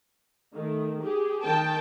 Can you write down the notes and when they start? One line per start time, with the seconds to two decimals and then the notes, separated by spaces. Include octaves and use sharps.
0.53 D#3 A3
1.00 G4 G#4
1.44 D#3 G5 A5